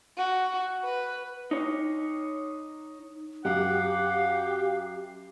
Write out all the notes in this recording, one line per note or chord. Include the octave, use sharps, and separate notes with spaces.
F#4
B4
D#4 C#5
F#2 G4 F5 F#5